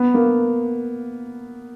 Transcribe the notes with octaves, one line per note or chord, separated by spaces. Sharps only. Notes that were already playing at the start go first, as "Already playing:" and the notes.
Already playing: B3
A#3